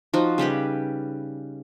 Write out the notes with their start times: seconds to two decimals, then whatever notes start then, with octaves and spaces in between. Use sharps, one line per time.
0.14 F3 D#4 F#4
0.38 C#3 G3 G4 B4